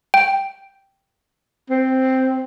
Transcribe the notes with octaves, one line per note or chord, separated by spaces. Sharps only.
G5
C4